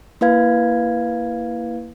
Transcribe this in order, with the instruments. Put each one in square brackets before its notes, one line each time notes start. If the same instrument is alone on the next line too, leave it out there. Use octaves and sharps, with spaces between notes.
[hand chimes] A#3 E4 B4 F5 G#6